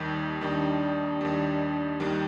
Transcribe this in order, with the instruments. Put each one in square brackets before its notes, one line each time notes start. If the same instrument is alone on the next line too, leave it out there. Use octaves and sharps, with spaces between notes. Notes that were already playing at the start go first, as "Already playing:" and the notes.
Already playing: [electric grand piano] D#2 D#3 G3
[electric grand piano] D#2 D#3 G3 [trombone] D4
[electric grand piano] D#2 D#3 G3
D#2 D#3 G3